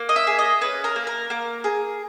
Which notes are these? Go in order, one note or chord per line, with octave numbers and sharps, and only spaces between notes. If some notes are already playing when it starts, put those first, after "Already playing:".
Already playing: A#3
D#5
E5
G#4
D#5
C#4 B4
A#4
A#3
A#4
A#3
G#4